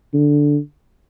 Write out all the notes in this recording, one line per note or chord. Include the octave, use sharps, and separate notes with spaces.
D3